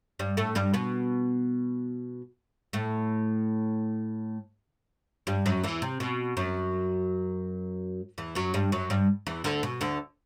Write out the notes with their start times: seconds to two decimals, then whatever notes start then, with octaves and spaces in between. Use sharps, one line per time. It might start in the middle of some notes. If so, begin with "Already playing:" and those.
0.19 G2 G3
0.37 A2 A3
0.55 G2 G3
0.74 B2 B3
2.73 A2 A3
5.27 G2 G3
5.46 F#2 F#3
5.63 E2 E3
5.82 C3
6.00 B2
6.37 F#2 F#3
8.18 E2 E3
8.35 F#2 F#3
8.54 G2 G3
8.72 F#2 F#3
8.90 G2 G3
9.27 E2 E3
9.44 D2 D3
9.63 B2
9.81 D2 D3